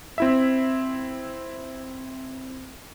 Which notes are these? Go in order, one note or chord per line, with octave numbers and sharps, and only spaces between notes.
C4 E4 E5